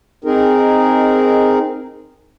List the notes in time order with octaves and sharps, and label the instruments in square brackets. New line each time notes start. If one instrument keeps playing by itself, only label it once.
[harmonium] C4 D#4 G#4 A#4